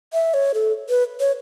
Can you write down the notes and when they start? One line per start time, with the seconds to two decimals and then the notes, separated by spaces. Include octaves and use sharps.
0.13 E5
0.34 C#5
0.54 A4
0.89 B4
1.20 C#5